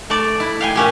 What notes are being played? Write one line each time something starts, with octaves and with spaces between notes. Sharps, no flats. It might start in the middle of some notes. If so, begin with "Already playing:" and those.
A3 D5
E4
F5 G5 G#5
A#2 C#4 G4